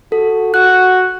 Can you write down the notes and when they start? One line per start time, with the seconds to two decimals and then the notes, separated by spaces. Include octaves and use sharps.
0.12 F#4 A4
0.54 F#4 F#6